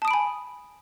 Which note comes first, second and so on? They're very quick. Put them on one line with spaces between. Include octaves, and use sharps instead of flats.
A5 D#6 D7 B5 G#5